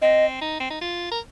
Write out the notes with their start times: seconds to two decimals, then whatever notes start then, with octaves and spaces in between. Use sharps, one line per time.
0.02 C4 D#5
0.42 D#4
0.60 C4
0.70 D#4
0.81 F4
1.11 A#4